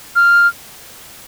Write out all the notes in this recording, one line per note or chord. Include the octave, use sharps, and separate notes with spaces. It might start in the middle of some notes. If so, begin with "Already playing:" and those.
F6